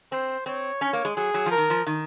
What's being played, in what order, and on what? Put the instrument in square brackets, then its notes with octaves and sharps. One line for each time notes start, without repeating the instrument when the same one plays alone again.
[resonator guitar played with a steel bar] C4 [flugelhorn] C5
[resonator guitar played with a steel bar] C4 [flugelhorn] C#5
[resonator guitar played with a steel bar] C#4
A#3
G#3
[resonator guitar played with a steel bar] F#3 [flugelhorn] G#4
[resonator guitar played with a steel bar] F#3
F3
[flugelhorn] A#4
[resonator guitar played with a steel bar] D#3
F3
D#3